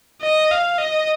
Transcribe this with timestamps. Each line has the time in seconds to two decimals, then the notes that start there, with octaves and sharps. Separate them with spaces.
0.22 D#5
0.51 F5
0.78 D#5